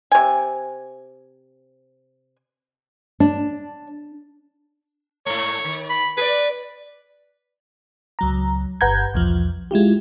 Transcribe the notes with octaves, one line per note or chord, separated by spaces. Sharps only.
C3 G#5
D4
G#2 A3 C#5
D#3
B5
G#4 B4 D5
C#2 F#3 A#5
G1 B4 F#5 A#5 G6 G#6
B1 E2 F3
G#3 E4 F4 G4